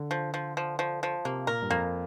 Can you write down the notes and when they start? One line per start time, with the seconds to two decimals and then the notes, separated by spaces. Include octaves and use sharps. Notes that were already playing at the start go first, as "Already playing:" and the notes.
Already playing: D3
0.11 F3
0.34 F3
0.57 F3
0.79 F3
1.03 F3
1.25 C3 A#3
1.47 A#2 A#4
1.62 G2
1.70 F2 A#3